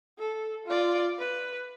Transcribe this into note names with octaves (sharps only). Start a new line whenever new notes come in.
A4
F4 D5
B4